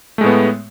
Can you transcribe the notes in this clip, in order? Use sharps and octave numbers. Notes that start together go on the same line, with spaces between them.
A2 G#3 A3 B3